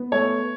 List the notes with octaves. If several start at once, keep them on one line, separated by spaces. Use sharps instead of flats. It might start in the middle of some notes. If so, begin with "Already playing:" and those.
Already playing: B3
A3 C#5